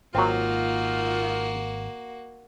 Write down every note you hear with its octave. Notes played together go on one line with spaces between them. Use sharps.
G#1 A#2 F#3 A#3 C4 D#4 F4 F#4